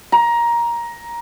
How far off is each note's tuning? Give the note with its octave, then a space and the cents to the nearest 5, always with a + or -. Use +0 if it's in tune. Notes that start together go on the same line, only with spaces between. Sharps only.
A#5 +15